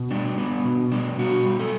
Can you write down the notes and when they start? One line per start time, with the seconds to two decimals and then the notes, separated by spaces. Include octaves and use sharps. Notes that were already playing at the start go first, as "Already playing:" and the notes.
Already playing: B2
0.11 G3 D4
0.38 B3 D4
0.65 B2
0.92 G3 D4
1.19 B2 F#4
1.46 G3
1.59 A4